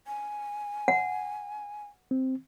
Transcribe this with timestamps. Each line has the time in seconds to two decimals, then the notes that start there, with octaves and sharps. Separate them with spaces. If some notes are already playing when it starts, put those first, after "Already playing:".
0.07 G#5
0.88 F#5
2.11 C4